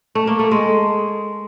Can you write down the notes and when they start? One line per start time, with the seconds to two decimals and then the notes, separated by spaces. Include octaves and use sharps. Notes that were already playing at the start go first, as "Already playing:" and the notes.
0.15 A3
0.27 A#3
0.39 A3
0.51 G#3